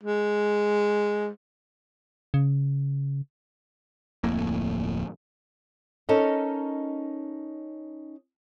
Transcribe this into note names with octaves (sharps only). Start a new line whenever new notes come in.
G#3
C#3
D1 F2 A2 A#3
C#4 D#4 A4 A#4 C#5 D#5